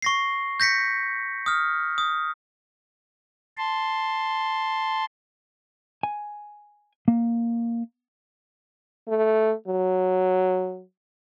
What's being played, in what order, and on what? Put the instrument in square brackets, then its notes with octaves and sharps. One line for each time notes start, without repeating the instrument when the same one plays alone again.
[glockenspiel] C#6 A#6 C7
G6 A#6 B6 C#7
D#6 F6
D#6
[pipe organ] A5 C6
[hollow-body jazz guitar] G#5
A#3
[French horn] A3
F#3